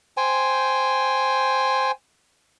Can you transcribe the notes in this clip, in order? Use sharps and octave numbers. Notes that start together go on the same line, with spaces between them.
C5 G5 G#5